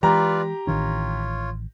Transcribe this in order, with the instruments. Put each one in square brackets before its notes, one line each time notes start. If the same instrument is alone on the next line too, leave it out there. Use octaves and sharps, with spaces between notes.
[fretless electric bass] E3 G#3 [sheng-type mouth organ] F4 B4 D5 [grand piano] G4 A#5
[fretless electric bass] A1 D#3 D4 [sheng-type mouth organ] F4 C#5